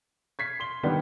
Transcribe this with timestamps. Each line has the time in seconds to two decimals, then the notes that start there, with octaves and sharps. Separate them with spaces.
0.39 G#6 B6 C7
0.60 C6 G7
0.83 D3 D#3 G3 B3 D4 D#4